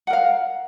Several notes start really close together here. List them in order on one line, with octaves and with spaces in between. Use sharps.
F#5 A#4 F5